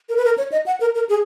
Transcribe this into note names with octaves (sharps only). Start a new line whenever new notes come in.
A#4
B4
A#4
C#5
D#5
F#5
A#4
A#4
G#4